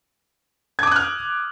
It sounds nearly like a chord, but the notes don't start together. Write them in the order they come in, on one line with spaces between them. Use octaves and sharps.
G#6 D6 D#6 F#6 F6